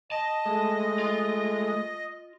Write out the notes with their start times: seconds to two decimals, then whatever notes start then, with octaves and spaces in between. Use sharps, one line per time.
0.12 D#5 A5
0.46 G#3 A3 D#6
0.99 F4